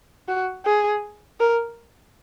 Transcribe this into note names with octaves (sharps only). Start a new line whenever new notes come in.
F#4
G#4
A#4